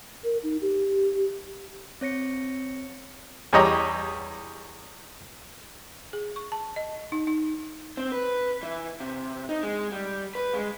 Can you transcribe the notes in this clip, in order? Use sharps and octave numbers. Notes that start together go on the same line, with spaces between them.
A#4
D#4
G4
C4 C#5 A#6 C#7
E2 G3 C#5 D#5 A#5 D6
G#4
C#6
A5
D#5
D#4
D#4
C4
B4
E3
C3
D#4
G#3
G3
B4
G#3